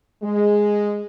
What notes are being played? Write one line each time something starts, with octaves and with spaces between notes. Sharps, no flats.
G#3